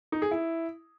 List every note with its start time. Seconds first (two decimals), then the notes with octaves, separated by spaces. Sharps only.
0.12 D#4
0.22 G#4
0.31 E4